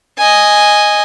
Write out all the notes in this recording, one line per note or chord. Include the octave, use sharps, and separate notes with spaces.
D#5 G#5